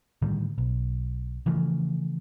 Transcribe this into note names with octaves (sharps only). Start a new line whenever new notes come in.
A2 D3 D#3 G3
B1
C#3 E3 F3 A3